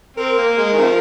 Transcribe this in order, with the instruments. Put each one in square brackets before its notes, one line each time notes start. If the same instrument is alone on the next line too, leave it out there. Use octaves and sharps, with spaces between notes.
[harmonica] C4 [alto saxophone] A#4
[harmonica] A#3
G#3
D#3
C3 F3